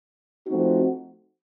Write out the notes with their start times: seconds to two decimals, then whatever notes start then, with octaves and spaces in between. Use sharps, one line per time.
0.47 F3 A3 C4 D#4 F#4